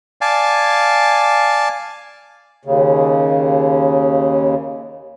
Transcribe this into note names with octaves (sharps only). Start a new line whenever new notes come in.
D5 F5 G#5 A5
D#2 C#3